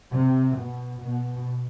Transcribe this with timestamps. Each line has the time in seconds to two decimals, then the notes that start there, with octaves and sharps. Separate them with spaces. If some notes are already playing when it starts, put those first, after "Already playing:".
0.13 C3
0.57 B2
1.01 B2